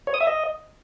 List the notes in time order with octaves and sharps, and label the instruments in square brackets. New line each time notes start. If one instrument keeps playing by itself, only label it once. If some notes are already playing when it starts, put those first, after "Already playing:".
[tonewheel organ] C#5
D#6
E5
D#5